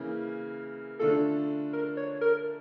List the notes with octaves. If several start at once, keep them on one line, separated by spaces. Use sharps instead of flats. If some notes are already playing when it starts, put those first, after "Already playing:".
Already playing: C#3 E3 A#3 E4
D3 A3 D4 F4 A4
A#4
C#5
A#4